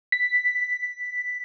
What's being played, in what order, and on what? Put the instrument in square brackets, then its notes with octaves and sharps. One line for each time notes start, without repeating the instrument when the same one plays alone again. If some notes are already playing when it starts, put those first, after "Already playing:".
[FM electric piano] B6